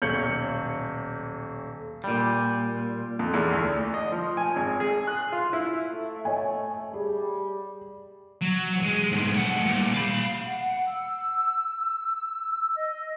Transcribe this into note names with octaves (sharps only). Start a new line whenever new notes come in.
D#1 B1 C#5 G6 C#7 F#7
A#2 G3
F2
E2
D2
D5
D#5
F3
G#5
G#1
G#4
F#6
F4
E4
A3
C#5 D#5 G#5
G3 G#4
F#3
G#3
G#2 B2
A2 F#5
A#2 G3
F5 B5
F#5
E6
D#5